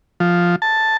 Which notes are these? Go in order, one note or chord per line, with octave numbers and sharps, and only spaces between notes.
F3
A5